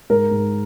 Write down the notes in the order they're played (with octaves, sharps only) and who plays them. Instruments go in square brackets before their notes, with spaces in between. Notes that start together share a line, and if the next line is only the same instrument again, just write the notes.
[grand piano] G#2 A#4
G#2